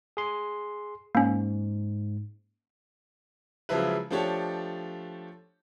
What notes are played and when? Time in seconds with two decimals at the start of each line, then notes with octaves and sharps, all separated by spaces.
0.17 G#4 C6
1.15 G#2 A#3 C#4
3.69 C#3 F3 F#3 G#3 E4 B4
4.11 F3 A3 D4 G4 C#5